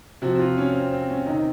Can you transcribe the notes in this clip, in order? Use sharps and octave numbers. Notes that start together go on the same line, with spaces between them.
C3 F3 F#4
F#4
F4
C#4
C4
C4
C#4
C3 D#3 D#4